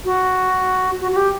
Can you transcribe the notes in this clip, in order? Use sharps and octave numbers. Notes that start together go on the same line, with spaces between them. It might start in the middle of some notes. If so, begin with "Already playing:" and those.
F#4
F#4
F#4
G4